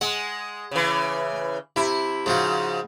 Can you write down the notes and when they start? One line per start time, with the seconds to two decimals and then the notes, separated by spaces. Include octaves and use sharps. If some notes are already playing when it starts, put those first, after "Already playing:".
0.01 G#3 F#5
0.71 C#3 E3
1.76 C3 E4
2.26 G#2 C#3 F3 F#4